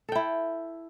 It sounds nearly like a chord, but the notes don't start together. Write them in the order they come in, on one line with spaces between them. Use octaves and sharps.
A4 G5 E4